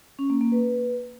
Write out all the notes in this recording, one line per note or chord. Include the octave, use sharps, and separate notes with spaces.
C#4
A#3
A#3
B4